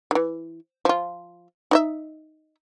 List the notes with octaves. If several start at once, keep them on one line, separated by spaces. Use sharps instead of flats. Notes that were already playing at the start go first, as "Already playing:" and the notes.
D#3 E3
F3 F4
D#4 D#5 E5